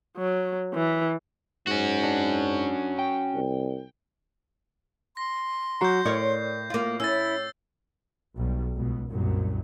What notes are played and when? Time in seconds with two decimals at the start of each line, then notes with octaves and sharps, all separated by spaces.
0.18 F#3
0.74 E3
1.67 G#2 C#4 F#4
2.04 D4
2.99 G5
3.35 C2
5.17 C6 A#6
5.81 F#3 F#4 A#5 G6 C7
6.05 A2 A#4 C#5 D5
6.70 A#3 F4
7.00 C#4 E4 E6 A6
8.35 B1 G3
8.75 C#2 B2
9.08 C2 F#2 A#2